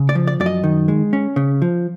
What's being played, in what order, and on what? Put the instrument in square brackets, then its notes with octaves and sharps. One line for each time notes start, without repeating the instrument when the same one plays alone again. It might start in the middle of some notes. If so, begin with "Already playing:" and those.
Already playing: [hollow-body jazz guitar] C#3
D5
F3
D5
F#2 D5
D#5
D#3
G#3
C#4
C#3
F3